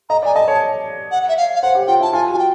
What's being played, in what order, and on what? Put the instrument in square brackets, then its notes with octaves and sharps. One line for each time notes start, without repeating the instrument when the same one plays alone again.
[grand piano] D#5 [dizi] A#5
[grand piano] D5 [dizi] G#5
[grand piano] D#5 [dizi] A5
[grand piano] C#5
[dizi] F#5
E5
F5
F5
[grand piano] C5 [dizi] F#5
[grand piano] G4
[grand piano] F4 [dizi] G5
[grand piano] E4 [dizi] A5
[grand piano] F4 [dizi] G#5
[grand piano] F#4 [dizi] G#5
[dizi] G5